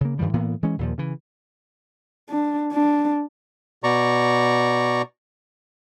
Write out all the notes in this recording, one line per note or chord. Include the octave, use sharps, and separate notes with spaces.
C#3 A#3
G2 D#3 F3 G3
A2 E3 A#3 B3
E3 G#3 C#4
D#2 A#2 F3
C#3 E3
D4
D4
B2 D5 A#5 C#6